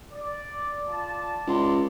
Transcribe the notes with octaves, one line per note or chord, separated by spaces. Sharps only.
D5
F4 D5 A5
C#2 B3 D5 C6